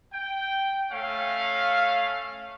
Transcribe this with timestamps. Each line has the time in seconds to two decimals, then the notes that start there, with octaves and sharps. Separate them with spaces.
0.13 G5
0.92 A3 C#4 F5